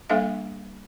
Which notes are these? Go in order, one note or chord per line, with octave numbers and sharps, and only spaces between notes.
G3 A#3 D4 A4 E5 F5